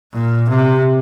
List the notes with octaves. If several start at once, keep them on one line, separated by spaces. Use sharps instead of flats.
A#2
C3